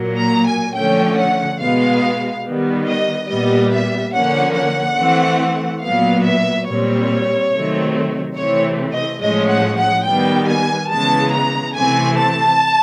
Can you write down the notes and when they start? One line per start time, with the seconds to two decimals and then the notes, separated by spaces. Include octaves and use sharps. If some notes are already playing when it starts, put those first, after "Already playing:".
Already playing: A#2 F#3 A#3
0.19 A#5
0.48 G#5
0.75 D3 F3 A3 C#4 G5
1.18 F#5
1.60 B2 G#3 B3 F5
2.45 D#3 G3 B3
2.87 D#5
3.29 A#2 G3 B3 D#5
3.72 E5
4.14 D3 F3 A#3 C#4 F#5
4.56 F#5
4.98 E3 A3 C4
5.83 A#2 F#3 B3 F5
6.25 E5
6.67 A#2 G3 C4 C#5
7.52 C3 D#3 F#3 A3 C4
8.36 C3 E3 A3 C4 C#5
8.93 D#5
9.21 A2 F3 G#3 C#4 D#5
9.49 F#5
9.77 F#5
10.06 D#3 G3 B3 G5
10.48 G#5
10.91 C#3 E3 G#3 B3 A5
11.33 A#5
11.75 C3 E3 A3 C4 G#5
12.17 A5